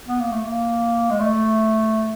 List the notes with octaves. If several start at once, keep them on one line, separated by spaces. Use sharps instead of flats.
B3
A#3
A3
A#3
G#3
A3